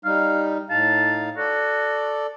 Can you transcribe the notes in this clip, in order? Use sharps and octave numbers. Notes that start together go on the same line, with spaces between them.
G3 D#4 F5
A2 D#4 F5 A5
F#4 A4 D5